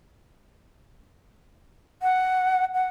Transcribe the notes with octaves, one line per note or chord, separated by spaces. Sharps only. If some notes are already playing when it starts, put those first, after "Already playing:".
F#5
F#5